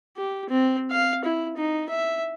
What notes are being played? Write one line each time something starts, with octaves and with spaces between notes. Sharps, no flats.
G4
C4
F5
E4
D#4
E5